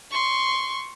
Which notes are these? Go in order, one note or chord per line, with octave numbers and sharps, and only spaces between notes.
C6 C#6